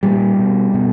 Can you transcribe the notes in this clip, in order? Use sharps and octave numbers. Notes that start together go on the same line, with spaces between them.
A#2 G3
B2
B2